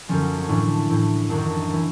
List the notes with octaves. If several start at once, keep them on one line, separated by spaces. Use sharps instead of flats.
F#2 D3 F3 C#4
C#4
A2 E3 D4
A2 E3
F#2 D#3 D4
E3